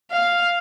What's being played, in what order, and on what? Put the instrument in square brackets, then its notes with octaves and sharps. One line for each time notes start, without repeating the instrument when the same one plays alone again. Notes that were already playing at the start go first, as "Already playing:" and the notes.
[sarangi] F5